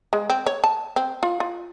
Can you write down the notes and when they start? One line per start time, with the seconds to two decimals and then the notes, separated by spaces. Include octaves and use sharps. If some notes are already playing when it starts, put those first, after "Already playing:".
0.13 G#3
0.30 C4
0.46 C#5
0.64 A5
0.96 C4
1.23 F4
1.40 F4